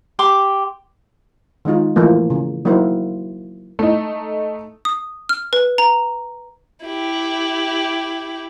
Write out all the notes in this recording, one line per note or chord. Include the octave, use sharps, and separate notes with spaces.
G4 C6 D6
D#3 G#3 D#4 F4
E3 F3 A3 A#3
C#3
F#3 A#3 D#4 E4 A#4 C5
A3 D#4
D#6
F6
B4
A#5
E4 G4